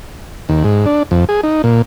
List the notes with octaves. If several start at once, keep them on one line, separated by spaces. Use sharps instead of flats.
D#2
G#2
D4
F2
G#4
D#4
A#2